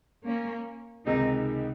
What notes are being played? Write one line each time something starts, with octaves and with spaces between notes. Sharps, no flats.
A#3 C#4
C#2 C3 D#3 G#3 C4 D#4